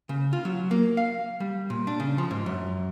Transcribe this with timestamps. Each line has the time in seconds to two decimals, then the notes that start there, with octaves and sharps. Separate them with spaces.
0.09 C#3
0.33 F4
0.45 F#3
0.71 A#3
0.97 F5
1.40 G3
1.70 A#2
1.87 D4
2.00 C#3
2.18 F3
2.31 G#2
2.46 F#2